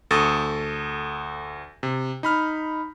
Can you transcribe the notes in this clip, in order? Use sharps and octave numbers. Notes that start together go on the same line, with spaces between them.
D2 A4 C#6 D#6 A6
C3
D#4 B5 F6